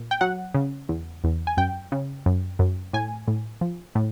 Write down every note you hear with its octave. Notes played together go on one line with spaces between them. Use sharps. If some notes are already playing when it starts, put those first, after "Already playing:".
Already playing: A#2
G5
F#3 F#5
C#3
E2
E2
G#5
F#2 G5
C#3
F#2
F#2
A2 G#5
A2
F3
A2